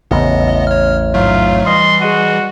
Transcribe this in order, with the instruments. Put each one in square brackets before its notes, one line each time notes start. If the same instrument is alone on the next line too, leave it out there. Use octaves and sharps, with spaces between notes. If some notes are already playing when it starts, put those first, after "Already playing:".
[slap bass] A1 [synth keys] E2 C#3 [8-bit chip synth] B3 D#5
[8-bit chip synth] C#5 F6
[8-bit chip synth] G#2 F#3 A3 [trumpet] F4
[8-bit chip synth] E3 G3 [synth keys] D#5 D#6 A#6 [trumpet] C6
[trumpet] F#4 [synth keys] G#4 D#5 D#7